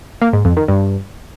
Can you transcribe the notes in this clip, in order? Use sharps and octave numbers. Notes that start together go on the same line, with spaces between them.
A#3
G#2
F2
D#3
G2